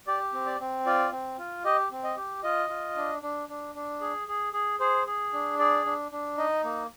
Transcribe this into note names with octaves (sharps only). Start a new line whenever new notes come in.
G4 D5
C4
D5
C4
F4 D5
C4
F4
G4 D#5
C4
D#5
G4
F4 D#5
F4
D4
D4
D4
D4
G#4
G#4
G#4
G#4 C5
G#4
D4
G#4 D5
D4
D4
D#4 D#5
A#3